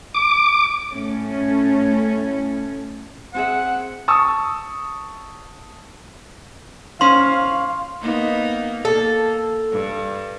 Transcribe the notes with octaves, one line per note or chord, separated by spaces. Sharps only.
D6
A2 A3 C#4
C4 G#4 E5 F#5
A5 C#6 D#6 E6
C#4 C5 F5 C6
A#3 B3 D#4
A#3 A4
G2